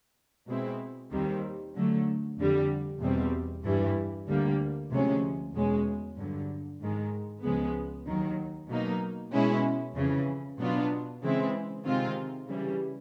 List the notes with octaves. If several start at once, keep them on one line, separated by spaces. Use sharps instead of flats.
B2 G#3 C4 E4
D#2 D#3 G3 C4
D3 F#3 A3
F2 D3 G3
E2 B2 G3 C4
G2 E3 G3
D2 D3 G3 A#3
D2 C3 F3 G#3 C#4
E2 B2 G#3 C#4
G2 D3 F#3
G#2 D#3 G#3
C#2 C#3 F3 G#3 B3
D#2 D#3 F#3
B2 F#3 A#3 D#4
B2 G#3 C#4 E4
F2 C#3 E3
B2 F#3 B3 D4 F4
C#3 E3 G#3 C4 E4
C3 D#3 G#3 C4 F4
C#3 E3 G3